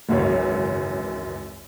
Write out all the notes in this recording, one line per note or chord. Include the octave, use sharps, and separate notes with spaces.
G#1 C#2 F#2 E3 C#5